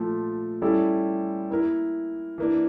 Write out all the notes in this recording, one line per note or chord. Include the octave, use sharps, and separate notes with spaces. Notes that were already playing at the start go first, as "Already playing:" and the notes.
Already playing: A#2 F3 A3
G3 C#4 E4 A4 D5
A#3 E4 A#4
E3 A#3 D4